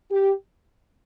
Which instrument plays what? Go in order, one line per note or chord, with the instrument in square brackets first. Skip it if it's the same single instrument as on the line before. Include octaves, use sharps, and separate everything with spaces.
[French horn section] G4